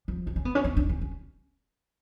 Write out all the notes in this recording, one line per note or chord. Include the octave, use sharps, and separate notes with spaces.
F3
D4
C#4
B3
C#4
D4
D4
C#4
C#4